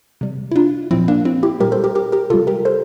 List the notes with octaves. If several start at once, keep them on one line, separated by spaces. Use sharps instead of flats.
C3 G3
E4
D4 F4
A#2 F3 C4 E4
A#3 D4
C4 E4
E4 G4
A#2 G3 G4 A#4
A4 C5
G4 A#4
G4 A#4
G4 A#4
C3 G3 F4 A4
G4 A#4
A4 C5